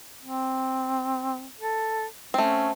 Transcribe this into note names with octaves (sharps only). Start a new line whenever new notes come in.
C4
A4
A3 C4 C#4